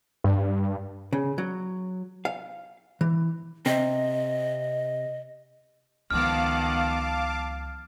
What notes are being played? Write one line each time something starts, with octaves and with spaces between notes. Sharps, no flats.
G2
C#3
F#3
F5
E3
C3 D#5
C#2 D#3 F3 B3 F5 A5 D6 F6